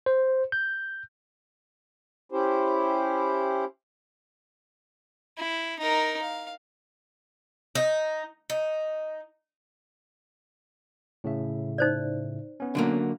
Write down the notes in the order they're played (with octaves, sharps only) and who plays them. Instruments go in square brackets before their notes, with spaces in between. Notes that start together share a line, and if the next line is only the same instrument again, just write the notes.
[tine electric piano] C5
G6
[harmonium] C#4 E4 G4 C5
[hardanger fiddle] E4
D#4 A#4
F5
[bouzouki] D#4
D#4
[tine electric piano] A2 C#3 E5
[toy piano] D#4 C5 D5
[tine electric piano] B3 C#4
[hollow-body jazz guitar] D3 F#3 A#3